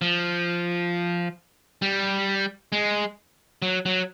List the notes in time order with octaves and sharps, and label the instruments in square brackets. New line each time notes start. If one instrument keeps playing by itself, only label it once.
[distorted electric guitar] F3
G3
G#3
F#3
F#3